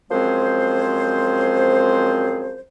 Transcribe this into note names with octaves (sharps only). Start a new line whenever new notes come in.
F#2 F3 G#3 C4 G#4 C5